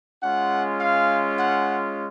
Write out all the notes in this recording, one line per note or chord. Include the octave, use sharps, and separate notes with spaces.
G#3 C#4 F4 F#5
F5
F#5